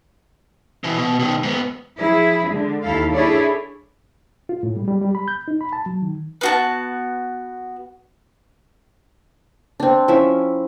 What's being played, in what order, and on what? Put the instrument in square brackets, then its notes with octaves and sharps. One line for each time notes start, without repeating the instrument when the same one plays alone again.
[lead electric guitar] B2 E3
B2
B2 D#3
G#2 B3
[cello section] F3 E4 G#4
D3 G#3
D#2 D#3 E4 A4 F5
D4 E4 G#4 A4 C#5 D5
[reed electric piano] F4
A2
G3
G3
G3
B5
G6
D#4
B5
A5
F#3
D#3
[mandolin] B3 F#4 A5
[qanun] C4 D4
F3 C#4 E4 E5